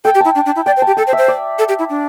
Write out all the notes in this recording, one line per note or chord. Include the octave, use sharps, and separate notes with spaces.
A4 G5
G4
E4 A5
D4
D4
E4
D5 G5
C5
G4 A5
A4 G5
C5
E5
C5
D5
A4
G4
E4
D4